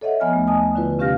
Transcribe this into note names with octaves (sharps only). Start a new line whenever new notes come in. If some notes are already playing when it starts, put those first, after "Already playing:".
A4 C#5 D#5 E5 F#5
F3 B3 D#5 G#5 F6
D#2 A3
D#5 G#5 A5 D#6
D3 E4 F4 B4
C3 C#4 G4 F5 F6 A#6